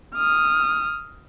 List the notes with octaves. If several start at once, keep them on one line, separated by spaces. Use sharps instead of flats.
D#6 F6